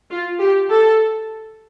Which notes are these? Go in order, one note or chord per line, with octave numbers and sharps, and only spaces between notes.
F4
G4
A4